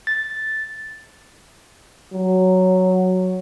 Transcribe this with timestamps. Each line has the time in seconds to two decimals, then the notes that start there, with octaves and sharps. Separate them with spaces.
0.07 A6
2.13 F#3